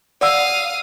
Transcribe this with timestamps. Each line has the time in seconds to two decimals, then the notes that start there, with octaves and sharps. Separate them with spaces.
0.21 D5 F5 F#5 D#6 E6